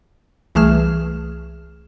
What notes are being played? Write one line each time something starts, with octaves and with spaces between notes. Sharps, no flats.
C2 E3 A3 G#4 F6 E7